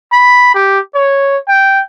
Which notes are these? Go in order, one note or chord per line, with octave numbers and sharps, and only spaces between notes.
B5
G4
C#5
G5